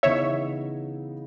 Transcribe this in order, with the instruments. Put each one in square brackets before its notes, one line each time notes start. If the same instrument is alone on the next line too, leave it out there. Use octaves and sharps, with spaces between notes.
[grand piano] C#3 E3 B3 D#4 [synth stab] C#5 E5